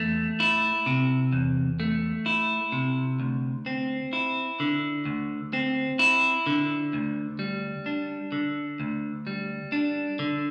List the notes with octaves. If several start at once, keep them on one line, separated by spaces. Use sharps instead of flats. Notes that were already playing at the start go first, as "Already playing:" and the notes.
Already playing: E2 A3
E4
C3
E2
A3
E4
C3
D2
C4
E4
D3
D2
C4
E4
D3
D2
G3
D4
D3
D2
G3
D4
D3